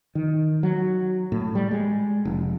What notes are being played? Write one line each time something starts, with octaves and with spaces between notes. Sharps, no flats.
D#3
F#3
A2
G3
G#3
F1